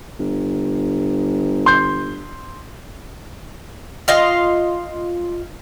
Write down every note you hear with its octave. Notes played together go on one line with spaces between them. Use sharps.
G1
C6 G6
F4 D#5 F5